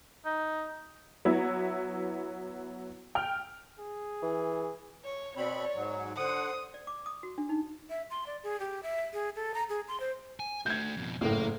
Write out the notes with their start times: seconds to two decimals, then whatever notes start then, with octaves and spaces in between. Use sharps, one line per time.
0.25 D#4
1.25 F#3 B3 E4
3.15 G5 F6
3.79 G#4
4.23 E3
5.05 C#5
5.37 B2 C4 C#5 D5 B5
5.75 G#2 F#3
6.17 D3 C5 F#5 D#6
6.74 D5
6.87 D6
7.06 D#6
7.23 F#4
7.38 D4
7.49 D#4
7.90 E5
8.10 C6
8.27 D5
8.43 G#4
8.60 G4
8.83 E5
9.13 G#4
9.36 A4
9.54 A#5
9.69 G#4
9.88 C6
10.00 C5
10.40 G#5
10.66 A3 F#4 G6 G#6
10.97 F2 B2
11.21 F#1 A2 A#3